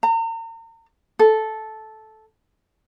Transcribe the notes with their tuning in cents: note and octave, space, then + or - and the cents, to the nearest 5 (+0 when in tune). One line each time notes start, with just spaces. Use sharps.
A#5 -40
A4 -10